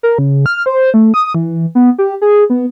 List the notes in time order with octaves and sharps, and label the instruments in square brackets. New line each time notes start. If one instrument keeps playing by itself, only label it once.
[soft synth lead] A#4
C#3
F6
C5
A3
D#6
E3
B3
G4
G#4
B3